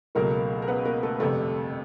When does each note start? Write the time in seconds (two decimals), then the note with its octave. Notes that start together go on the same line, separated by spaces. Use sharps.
0.15 C#2 B2 F#3 A3 A#3 A#4
0.62 A#4
0.68 B3 B4
0.85 A#3 A#4
1.03 A3 A4
1.20 G1 F2 C3 A3 A4